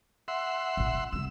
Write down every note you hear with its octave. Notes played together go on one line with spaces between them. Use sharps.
E5 F#5 C6
A1 A#2
A#2
C2 A3 E6